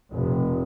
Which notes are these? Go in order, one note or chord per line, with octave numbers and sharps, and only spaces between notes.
F1